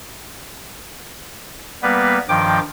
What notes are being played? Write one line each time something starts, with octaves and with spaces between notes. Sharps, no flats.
G3 A#3 B3 B4
G2 D#3 F3 G5 D6